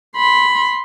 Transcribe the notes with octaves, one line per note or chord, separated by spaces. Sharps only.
B5 C6